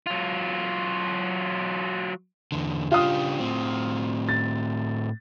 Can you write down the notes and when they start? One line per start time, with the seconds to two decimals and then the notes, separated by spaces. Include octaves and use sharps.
0.07 F#3 F4
2.52 E2 D3
2.91 C#3 D4 F4 G4 F5 D#6
3.40 A2 C4
4.29 A6